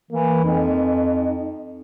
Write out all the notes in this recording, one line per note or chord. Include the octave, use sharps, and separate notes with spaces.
E3 A#3
F2 D#4